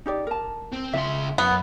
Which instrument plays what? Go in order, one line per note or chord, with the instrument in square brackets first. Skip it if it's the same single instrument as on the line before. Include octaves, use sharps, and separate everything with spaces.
[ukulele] D#4 G4 D5
A#4 A5
[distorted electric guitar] C4
[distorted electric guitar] C#2 C6 [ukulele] E5
[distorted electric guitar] F#2 [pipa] B3 [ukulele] F#5